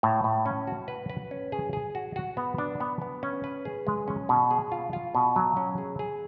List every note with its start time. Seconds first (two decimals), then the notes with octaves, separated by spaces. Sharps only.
0.03 A2
0.24 A2
0.46 C#4
0.67 F#4
0.88 B4
1.10 B4
1.31 C#4
1.52 G#4
1.73 G#4
1.95 F#4
2.16 F#4
2.37 B3
2.58 D4
2.80 B3
3.02 B3
3.23 C#4
3.44 B4
3.65 G#4
3.87 G#3
4.08 C#4
4.29 B2
4.51 G#4
4.72 F4
4.93 F4
5.15 B2
5.36 F#3
5.57 C#4
5.78 G#4
5.99 G#4